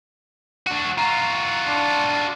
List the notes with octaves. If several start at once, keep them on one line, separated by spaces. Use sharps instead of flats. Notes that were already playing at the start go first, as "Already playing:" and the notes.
D4 F#4
F4 F#4 A#5
D4